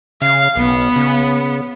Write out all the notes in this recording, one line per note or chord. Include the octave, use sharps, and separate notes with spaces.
C#3 F5
B1 B3
C#3